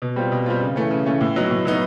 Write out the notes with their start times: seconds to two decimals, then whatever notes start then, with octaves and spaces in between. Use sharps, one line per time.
0.02 B2
0.16 G3 C4 F4
0.32 B2
0.46 G3 C4 F4
0.61 C#3
0.76 E3 A3 C#4
0.91 C#3
1.06 E3 A3 C#4
1.21 A2
1.36 F#3 B3 D#4
1.51 A2
1.65 F#3 B3 D#4